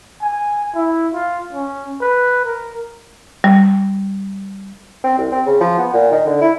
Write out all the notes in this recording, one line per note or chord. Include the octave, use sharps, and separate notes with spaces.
G#5
E4
F4
C#4
B4
A#4
G3
C4
C2
C4
C#3
F3
B3
A#2
D#3
D3
E4